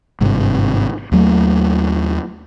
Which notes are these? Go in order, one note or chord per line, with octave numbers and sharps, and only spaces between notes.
G#1 G2 C3
D#2 F#3 A3